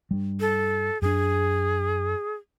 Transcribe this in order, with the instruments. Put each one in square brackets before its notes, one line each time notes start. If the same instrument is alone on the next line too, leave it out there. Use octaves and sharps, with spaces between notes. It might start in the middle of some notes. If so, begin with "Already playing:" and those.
[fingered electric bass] G2 G3
[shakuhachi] A4
[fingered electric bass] F#2 D4 [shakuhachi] G#4